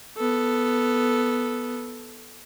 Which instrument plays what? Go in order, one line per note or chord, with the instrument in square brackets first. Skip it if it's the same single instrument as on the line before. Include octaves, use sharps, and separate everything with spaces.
[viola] B3 A4